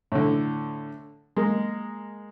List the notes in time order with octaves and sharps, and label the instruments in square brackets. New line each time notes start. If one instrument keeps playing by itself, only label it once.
[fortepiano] A2 D3
G#3 A#3